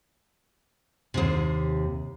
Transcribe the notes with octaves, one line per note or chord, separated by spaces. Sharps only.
D#2 C3